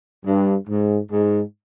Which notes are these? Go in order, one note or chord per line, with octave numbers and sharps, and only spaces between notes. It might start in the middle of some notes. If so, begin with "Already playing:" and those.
G2
G#2
G#2